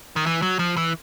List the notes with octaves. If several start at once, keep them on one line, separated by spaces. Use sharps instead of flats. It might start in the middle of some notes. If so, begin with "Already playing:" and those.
D#3
E3
F#3
F3
E3